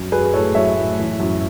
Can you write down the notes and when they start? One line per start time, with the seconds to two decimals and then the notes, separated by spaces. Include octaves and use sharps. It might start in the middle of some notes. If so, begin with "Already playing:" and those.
Already playing: F#2
0.12 F#3 G#4 B4
0.33 A2 A4 C#5
0.55 F#3 C#5 E5
0.77 A2
0.99 E3
1.20 F#2